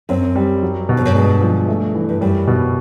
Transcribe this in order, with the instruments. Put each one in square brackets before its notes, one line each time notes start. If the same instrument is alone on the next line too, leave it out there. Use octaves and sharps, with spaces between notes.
[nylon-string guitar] F#2 [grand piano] C4
[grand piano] G3
F#3
B2
[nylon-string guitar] F2
F#2
[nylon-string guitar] G2 [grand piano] G#3
[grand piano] F3
A3
E3
[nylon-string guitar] G2
[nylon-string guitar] F#2 [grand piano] G3
[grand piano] B2